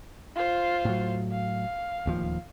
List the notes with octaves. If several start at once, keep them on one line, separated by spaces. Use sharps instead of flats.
F4 C5
A2 F#3
F5
D1 D#2 F3